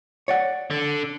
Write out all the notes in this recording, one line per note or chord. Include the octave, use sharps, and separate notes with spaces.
C#5 D5 F#5
D3